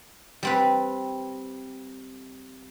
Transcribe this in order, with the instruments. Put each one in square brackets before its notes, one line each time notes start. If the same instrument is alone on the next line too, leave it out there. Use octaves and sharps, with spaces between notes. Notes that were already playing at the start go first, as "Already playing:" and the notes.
[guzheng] G3 C4 B4